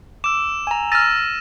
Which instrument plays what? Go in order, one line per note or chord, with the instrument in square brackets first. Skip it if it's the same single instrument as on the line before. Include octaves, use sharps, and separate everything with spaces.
[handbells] D6 [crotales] E6 E7
[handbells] G#5 A#5
[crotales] E6 A#6 D#7 [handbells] F6 A6